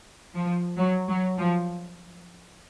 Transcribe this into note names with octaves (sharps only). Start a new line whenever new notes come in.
F3
F#3
F#3
F3